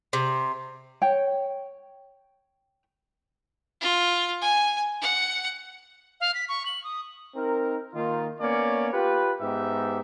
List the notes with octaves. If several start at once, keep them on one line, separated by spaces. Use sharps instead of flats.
C3
C#5 G5
F4
G#5
F#5
F5
B6
C#6
F#7
D#6
C4 D#4 A#4
D#3 A#3 D#4 F4
A#3 B3 C#4 C#5 D5
F4 G4 B4
G#2 B3 D#4 G4 E5